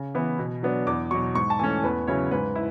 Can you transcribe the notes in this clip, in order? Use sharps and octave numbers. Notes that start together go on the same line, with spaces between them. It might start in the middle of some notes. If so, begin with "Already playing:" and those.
Already playing: C#3
E3 B3 E4
B2
F#3 B3 D4
E2 D6
B2 F#3 C#6
G#2 C#6
A5
E3 A3 C#4 G#5
E2 B4
C#3 F#3 C#4 E4 C#5
G#2 B4
E4